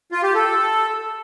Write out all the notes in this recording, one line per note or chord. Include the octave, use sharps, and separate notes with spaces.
F4
G4
A4